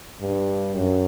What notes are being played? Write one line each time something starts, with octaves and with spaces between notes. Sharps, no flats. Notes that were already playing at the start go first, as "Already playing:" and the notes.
G2
F#2